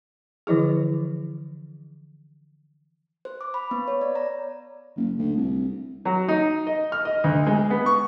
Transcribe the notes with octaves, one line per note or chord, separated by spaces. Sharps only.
D3 E3 F3 E4 G#4
C5
D6
B5
B3
C#5
D5
A#5
F#1
D2
C2
F#3
D#4
D#5
F6
D#5
D2
G#3
B3
C#6